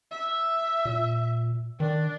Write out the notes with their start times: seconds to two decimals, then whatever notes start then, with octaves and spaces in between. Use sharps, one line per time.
0.11 E5
0.85 A#2
1.80 D#3 D4